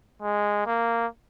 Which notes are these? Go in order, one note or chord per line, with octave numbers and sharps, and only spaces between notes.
G#3
A#3